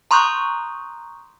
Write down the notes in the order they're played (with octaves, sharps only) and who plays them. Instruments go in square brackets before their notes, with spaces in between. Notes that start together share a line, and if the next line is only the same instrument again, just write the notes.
[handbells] A#5 C6 C#6 D#6 F#6 G6